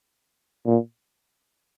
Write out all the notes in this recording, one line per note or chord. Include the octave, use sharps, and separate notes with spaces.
A#2